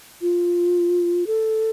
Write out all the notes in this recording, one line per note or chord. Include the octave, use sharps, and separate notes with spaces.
F4
A4